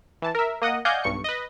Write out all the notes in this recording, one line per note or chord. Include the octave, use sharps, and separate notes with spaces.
E3 A5
A#4 E5
A#3 D#5 F#5 D#6
D5 D#5 F5 F#5 G#5 G6
B1 G2 C#6 C#7
B4 D#5